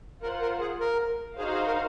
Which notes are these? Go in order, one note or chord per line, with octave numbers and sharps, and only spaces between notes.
F4 A#4 C5 F#5
A#4
G#4
A#4
D#4 F#4 G#4 C5 F5
G#4
A#4